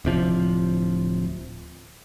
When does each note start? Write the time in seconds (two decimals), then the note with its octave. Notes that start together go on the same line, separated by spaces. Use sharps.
0.05 D1 C3 F3